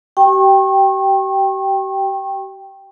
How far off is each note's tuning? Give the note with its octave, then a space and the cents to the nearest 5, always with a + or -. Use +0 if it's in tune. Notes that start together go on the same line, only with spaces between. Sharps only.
G4 -40 G5 +0 C#6 -35